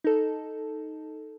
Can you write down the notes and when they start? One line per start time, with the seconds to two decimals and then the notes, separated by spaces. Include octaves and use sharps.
0.04 D#4 A4